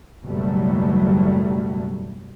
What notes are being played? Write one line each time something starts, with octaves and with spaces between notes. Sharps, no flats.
F#1 D#2 B2 F#3 G3 A3